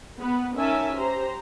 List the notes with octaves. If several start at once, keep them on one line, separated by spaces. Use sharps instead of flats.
B3 B4
C#4 D#4 A#4 E5 G#5 A5
G4 C5 A#5